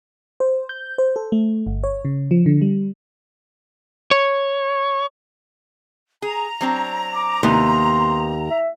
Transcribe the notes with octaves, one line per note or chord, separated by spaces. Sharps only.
C5
G6
C5
A4
A3
G1
C#5
C#3
F3
D3
G3
C#5
G#4 A#5
F#3 C4 D4
D6
D#2 C3 B3 C6
E5